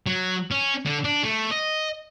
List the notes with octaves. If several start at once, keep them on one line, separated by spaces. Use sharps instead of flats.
F#3
C#4
D3
D4
A3
D#5